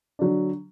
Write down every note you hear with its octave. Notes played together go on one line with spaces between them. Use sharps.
D3 F#3 D4